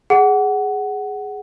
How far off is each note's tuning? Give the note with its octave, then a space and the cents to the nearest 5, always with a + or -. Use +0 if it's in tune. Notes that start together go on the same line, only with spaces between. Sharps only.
G#4 +0 F#5 +15